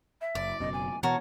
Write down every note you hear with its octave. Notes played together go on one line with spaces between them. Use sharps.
E5
F#1 D5
F#1 F#2 B2 D#5
G#5
B2 E3 B3 F#4 A#4 C#5 A5